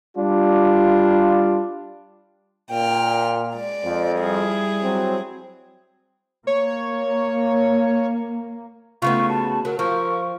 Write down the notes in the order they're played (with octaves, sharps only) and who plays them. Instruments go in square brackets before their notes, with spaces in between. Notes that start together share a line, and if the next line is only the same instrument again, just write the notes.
[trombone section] G3 D4 F4
[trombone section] A#2 [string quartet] G5 F6
[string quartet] G#3 D5
[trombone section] F2
[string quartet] G3 E4 G#4
[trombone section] F#3 C4
[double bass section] A#3 [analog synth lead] C#5
[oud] C#3 A3 B3 [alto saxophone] F4 [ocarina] C#6
[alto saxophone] F#4 [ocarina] A5
[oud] F#3 [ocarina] A#4
[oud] F3 [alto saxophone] A#4 [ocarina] C#6